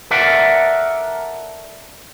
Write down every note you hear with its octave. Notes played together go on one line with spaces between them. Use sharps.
A4 A#4 D5 E5 F#5